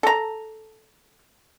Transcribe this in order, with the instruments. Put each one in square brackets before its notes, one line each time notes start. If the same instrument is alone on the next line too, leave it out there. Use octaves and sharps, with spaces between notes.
[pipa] A4 A#5